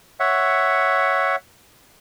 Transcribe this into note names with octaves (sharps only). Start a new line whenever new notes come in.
C#5 E5 F#5